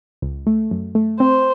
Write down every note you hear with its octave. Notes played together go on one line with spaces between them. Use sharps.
C#2
A3
F#2
A3
C4 C5